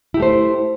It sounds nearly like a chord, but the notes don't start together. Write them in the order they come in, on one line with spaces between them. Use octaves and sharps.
E4 G4 A3 C5